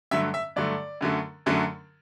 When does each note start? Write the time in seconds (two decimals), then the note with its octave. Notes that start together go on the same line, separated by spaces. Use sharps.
0.11 G2 D3 F#3 A3 E5
0.34 E5
0.56 G2 D3 F#3 A3 D5
1.01 F#2 D3 F#3 A3
1.46 F#2 D3 F#3 A3